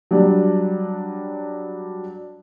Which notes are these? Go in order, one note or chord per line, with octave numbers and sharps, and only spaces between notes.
F#3 G3 D4